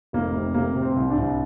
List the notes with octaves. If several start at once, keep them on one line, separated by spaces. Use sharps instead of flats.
F1 A#3
C3
C3 A#3
C3
C4
C2
D4
C2